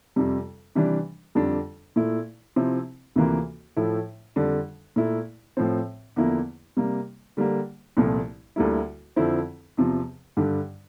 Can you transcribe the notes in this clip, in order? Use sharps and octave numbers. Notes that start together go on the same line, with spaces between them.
F2 C3 G3
C3 E3 G3 D4
F2 D3 G3 D4
A#2 A3 E4
C3 F3 C4 E4
D2 C3 E3 A#3 F4
A2 F3 A3 E4
F2 D3 G3 D4
A#2 A3 E4
A2 F3 C4
E2 D3 F3 A#3 E4
C3 G3 A#3
D3 G3 A#3
C2 A#2 F3 A3
D2 D3 G3 A#3 E4
F2 D3 F3 C4 E4
E2 C3 F3
G2 D3 G3 D4